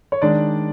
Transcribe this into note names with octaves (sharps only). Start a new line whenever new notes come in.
C#5
D#3 G#3 D4 D5